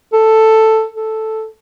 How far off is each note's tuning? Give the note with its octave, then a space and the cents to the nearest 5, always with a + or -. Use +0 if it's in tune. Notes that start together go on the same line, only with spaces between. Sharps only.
A4 +5
A4 +0